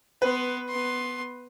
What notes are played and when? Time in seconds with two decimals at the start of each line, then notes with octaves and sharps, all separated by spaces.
0.22 B3 B4 C6
0.68 B3 C6